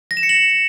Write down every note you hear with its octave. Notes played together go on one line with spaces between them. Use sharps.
A#6
E7
C#7
F#7